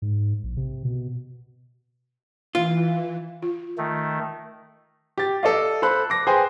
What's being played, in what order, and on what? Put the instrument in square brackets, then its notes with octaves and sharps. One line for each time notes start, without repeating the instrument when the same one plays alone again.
[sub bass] G#2
A#1
C3
B2
[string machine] E3 [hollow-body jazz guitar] F4
[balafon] F4
[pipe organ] D#3 A3
[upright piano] G4 A6
A4 D5 D#5 F5
A4 C5 B5 F#6
D6 A#6
G#4 B4 C5 G5 G#5 C6